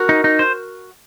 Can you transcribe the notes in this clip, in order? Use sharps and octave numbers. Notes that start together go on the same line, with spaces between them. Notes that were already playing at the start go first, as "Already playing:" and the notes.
Already playing: F#4 A#4
D#4
D#4
C5